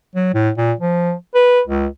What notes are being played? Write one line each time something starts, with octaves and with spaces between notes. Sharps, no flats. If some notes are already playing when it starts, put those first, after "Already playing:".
F#3
A2
A#2
F3
B4
C#2